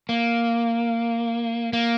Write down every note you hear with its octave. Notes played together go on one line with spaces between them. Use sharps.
A#3
A#3